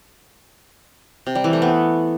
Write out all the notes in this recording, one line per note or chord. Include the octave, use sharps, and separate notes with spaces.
C3
G3
E3
A3
B3